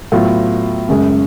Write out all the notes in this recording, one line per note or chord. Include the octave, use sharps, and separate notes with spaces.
A2 F#3 B3 F4
F#2 C#3 G#3